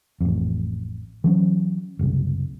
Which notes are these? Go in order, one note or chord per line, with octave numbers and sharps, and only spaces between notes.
A1 F2
E3 F#3 C#4
F#1 C2